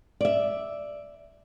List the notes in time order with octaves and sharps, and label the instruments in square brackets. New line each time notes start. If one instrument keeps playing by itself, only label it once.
[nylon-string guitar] D5 E5